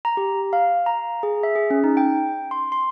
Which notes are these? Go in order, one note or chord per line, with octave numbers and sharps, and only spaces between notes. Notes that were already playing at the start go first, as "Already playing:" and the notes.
A#5
G4
F5
A#5
G#4
E5
G#4
C#4
D#4
G5
C6
C6